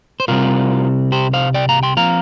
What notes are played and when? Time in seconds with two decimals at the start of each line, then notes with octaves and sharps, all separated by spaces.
0.20 C5
0.28 C2 C3 G3 C4 F4 A#4
1.12 G4 C5
1.33 C5 F5
1.54 D5 G5
1.69 F5 A#5
1.83 G5 C6
1.97 F3 C4 F4 F5 A#5